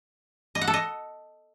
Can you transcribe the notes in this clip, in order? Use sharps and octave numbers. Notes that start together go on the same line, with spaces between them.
D#5
F#5
A4
D#5